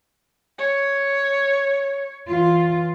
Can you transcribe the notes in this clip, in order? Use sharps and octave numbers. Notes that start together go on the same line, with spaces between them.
C#5
E3 F4